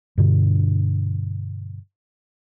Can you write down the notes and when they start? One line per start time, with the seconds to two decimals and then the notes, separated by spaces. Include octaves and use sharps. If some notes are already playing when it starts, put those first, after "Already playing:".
0.18 G2 B2 D3